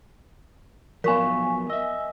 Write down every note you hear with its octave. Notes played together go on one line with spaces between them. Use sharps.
F3 F#3 B3 A#4 F5 G#5 C#6 B6
D#5 E5 E6